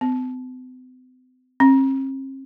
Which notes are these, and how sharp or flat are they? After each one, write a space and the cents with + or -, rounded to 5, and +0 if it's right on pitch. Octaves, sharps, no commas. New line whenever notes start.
C4 -45
C4 +45